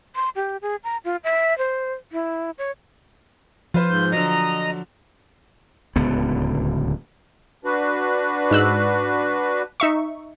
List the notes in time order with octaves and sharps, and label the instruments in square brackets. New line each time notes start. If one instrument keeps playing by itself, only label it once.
[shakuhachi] C6
G4
G#4
A#5
F4
E5
C5
E4
C#5
[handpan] F3 [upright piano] F4 B4 C5
[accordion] G#2 G6
[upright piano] D3 F#3 [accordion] D#5 A#5
[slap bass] D1 C#2 D3 B3
[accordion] D4 F#4 B4
[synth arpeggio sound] G#2 E6 F#6
D#4 E5 C#6